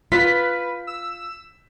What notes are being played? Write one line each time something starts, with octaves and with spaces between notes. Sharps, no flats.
F4 B4 B6
E6